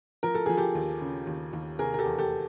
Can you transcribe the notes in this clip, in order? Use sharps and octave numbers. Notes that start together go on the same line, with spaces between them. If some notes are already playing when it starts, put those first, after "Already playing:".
F3 A#4
A4
F3 G#4
G4 A4
D#2
C#3
D#2
D#2
C3 G#4 A#4
A#4
G4 A4
E2
G4 A4